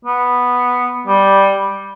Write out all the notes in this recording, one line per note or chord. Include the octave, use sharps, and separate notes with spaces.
B3
G3